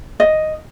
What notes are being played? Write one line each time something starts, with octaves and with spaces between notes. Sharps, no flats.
D#5